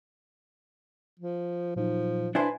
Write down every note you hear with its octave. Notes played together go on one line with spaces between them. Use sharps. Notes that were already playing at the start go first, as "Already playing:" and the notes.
F3
A#2 F3 F#3 D#4
D4 E4 B4 C5 G#5 C6